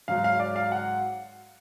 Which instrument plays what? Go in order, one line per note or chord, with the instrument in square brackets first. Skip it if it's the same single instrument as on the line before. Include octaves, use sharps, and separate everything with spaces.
[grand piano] G#2 F#3 F5
F5
D5
F5
F#5